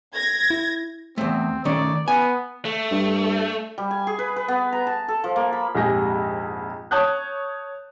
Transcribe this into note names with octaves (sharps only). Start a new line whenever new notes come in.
G#6 A#6
E4
E2 A3 C4
D#3 A3 C#4 D5
B3 G#5
A3
G2
G3
G#5
G#4
B4
B4
B3
A#5
A5
A4
F3
A#3
B5
A#1 F2 G#2 G4 G#4 A#6
C#5 A5 D#6 F#6 G6